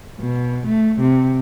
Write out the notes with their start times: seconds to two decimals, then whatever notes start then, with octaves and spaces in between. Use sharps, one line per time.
0.19 B2
0.66 A3
1.00 C3